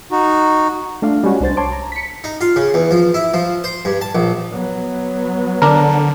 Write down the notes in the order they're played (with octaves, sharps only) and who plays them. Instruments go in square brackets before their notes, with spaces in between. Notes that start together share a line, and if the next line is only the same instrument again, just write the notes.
[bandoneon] D#4 F#4
[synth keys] A3 D4 F4 F5
G3 G#3 C#4 F#4
C2 D4 C5 A6
C#5 A5 C6 D6
A#5
B6 C#7
[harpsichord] D#4
F4
C#3
E2
F3
E4
F3
C5
G2
A5
A#1
[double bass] F#3 B3
[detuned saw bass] D3 [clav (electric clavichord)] D4 A#4